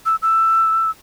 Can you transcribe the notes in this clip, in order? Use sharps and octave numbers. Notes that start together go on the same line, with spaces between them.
E6
E6